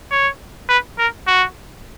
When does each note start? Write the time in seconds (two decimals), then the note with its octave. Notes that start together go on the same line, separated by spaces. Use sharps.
0.11 C#5
0.69 B4
0.98 A#4
1.27 F#4